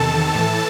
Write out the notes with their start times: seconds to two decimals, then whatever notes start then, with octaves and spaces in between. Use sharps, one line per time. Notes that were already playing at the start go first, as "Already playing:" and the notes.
Already playing: E2 C3 D#3 A4 A5
0.34 A2 E3